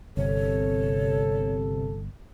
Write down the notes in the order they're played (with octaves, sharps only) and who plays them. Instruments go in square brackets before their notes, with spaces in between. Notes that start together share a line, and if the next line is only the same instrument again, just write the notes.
[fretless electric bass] G1 [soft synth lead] C3 [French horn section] A4 [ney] C#5